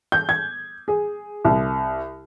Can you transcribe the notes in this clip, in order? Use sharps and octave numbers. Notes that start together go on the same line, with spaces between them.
G6
G#6
G#4
C2